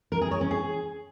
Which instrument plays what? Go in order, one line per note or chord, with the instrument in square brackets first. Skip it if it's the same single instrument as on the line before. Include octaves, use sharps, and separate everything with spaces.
[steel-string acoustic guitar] A#4
G#4
C#5
C#4
G#4